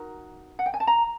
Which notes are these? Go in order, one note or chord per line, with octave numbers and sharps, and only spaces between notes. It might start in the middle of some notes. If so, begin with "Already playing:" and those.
Already playing: D#4 F#4 A#4
F#5
G5
G#5
A5
A#5